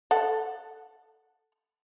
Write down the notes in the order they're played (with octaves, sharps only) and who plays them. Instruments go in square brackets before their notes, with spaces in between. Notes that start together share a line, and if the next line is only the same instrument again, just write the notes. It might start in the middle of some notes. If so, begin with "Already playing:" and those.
[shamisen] A4 F#5